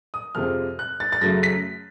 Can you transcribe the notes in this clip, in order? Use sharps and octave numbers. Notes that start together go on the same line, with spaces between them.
D#6
F2 C3 F3 G#3 F6
F#6
A6
A6
F#2 C#3 F#3 A3 A#6
B6